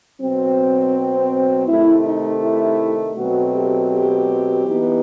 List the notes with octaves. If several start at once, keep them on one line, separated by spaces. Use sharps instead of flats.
B2 F#3 C4
C3 D#3 A3 E4
D#4
E4
B2 F#3 A3 C4 F#4
G4
G4
E3 B3 D#4